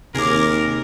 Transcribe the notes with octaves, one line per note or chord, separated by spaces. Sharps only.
D#2 C3 G#4 A#4 D6